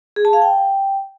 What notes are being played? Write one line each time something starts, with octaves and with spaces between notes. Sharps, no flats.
G#4
A5
F5
G5